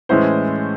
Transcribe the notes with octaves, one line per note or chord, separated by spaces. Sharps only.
A2 E3 G#3 C#4 E4 C5